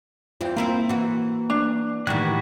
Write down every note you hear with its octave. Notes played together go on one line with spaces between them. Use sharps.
E2 E3 C4 F4 G5
A#3 C4 E4 F4 A#5
E3 F#4
D4
A2 D#3 E3 G3 F#4 F#6 G#6